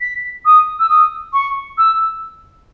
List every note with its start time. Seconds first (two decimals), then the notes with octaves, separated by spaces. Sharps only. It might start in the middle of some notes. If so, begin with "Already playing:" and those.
0.01 B6
0.45 D#6
0.79 E6
0.89 D#6
1.33 C#6
1.78 E6